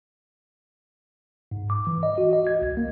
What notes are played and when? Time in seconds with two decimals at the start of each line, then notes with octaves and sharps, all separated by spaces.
1.51 G#2
1.70 D6
1.87 E3
2.03 D#5
2.18 F#4
2.33 D#5
2.47 G#6
2.62 C2
2.77 A#3